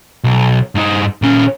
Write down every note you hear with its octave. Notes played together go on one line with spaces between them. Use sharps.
B1
G2 D#4
A#2 C#4